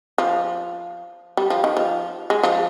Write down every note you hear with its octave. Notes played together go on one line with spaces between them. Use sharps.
F3
G3
F3
D#3
F3
G#3
F3